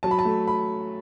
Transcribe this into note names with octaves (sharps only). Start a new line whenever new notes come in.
F#3 A5
B5
A5
A3
B5